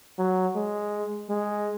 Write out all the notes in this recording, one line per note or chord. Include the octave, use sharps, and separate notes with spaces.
F#3
G#3
G#3